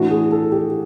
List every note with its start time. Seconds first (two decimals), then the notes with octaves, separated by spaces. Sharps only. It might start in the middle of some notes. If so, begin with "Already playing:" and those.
Already playing: A2 E3 A3 D4 F#4
0.11 G#4
0.32 A4
0.52 G4